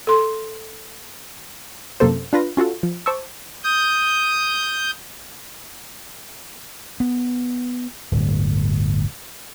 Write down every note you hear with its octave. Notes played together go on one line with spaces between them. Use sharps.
A4 C6
F#2 C3 A#3 A4 C5
D4 F4 B4 A#6
C#4 F4 F#4 A4
F3
C5 A5 C#6 D6 E6
D#6 G6
B3
D1 G1